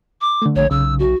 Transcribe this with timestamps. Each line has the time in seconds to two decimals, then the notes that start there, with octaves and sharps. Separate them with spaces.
0.21 D6
0.42 D3 A3
0.56 A#1 C#5
0.71 B1 C#3 E6
0.99 F#4